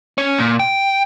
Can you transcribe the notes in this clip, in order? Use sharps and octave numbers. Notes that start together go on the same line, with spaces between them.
C#4
A#2
G5